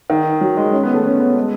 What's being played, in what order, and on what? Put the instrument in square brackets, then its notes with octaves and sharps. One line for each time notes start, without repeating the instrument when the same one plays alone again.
[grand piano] D#3
F#3
G#3
C#4
B3
A3
C#4
B3
G#3